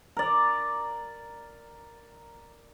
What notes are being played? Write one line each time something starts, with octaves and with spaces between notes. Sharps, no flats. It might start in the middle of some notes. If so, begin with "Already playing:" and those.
A#4 D5